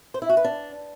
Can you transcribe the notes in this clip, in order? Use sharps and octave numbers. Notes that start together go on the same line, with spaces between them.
C5
E4
F#4
B4
D4